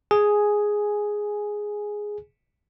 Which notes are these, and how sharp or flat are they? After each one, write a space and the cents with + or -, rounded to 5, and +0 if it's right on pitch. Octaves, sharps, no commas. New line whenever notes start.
G#4 +0 G#5 +5